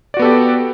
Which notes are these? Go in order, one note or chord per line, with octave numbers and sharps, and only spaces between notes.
B3 F#4 G4 A4 D5